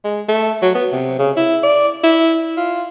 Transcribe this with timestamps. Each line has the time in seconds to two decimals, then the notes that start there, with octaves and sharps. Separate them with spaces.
0.04 G#3
0.28 A3
0.62 F#3
0.75 B3
0.92 C3
1.19 C#3
1.37 E4
1.63 D5
2.03 E4
2.57 F4